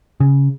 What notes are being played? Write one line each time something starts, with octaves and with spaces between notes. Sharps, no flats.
C#3